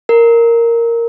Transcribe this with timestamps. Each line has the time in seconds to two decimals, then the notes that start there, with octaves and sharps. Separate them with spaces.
0.09 A#4